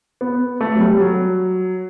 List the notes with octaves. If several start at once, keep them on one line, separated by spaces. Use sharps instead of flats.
B3
A3
F#3
G3
F#3